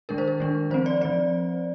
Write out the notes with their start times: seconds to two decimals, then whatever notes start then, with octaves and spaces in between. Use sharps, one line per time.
0.09 D#3 G#3 D4 A#4
0.18 C5
0.28 A#4
0.40 D#3 G#3 D4
0.70 F3 C4 C5
0.86 D5
1.01 F3 C4 D5